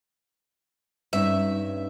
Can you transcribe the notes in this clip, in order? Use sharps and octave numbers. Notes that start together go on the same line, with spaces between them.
G2 C#4 D#4 E5